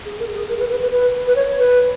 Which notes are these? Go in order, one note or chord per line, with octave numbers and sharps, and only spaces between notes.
G#4
A#4
G#4
A#4
B4
B4
B4
B4
B4
C#5
B4